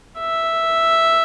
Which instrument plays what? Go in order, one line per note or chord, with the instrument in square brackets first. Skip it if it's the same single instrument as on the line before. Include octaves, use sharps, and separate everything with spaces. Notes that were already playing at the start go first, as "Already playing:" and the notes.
[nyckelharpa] E5